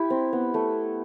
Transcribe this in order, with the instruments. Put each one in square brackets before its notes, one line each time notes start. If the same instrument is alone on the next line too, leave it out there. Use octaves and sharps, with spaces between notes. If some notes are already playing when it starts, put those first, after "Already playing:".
Already playing: [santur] E4 G4
C4
B3
A3